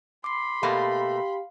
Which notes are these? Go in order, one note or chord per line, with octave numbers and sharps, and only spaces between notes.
B5 C6 D6 C7
B2 A3 A#3 G4 F5